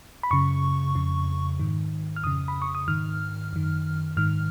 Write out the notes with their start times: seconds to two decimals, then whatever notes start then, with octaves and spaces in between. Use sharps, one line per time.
0.23 B5
0.31 F#2 C#3 C#6
0.95 F2 C#3
1.60 G#2 D#3
2.16 F6
2.24 F2 C#3 D#6
2.48 B5
2.62 C#6
2.75 D#6
2.88 G#2 D#3 F6
3.53 F#2 D#3
4.17 G#2 D#3 F6